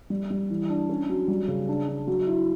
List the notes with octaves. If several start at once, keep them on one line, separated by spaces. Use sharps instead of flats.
G3
G3
E3
D4
C#4
F#3
G3
C#3
D4
D4
F#3
E4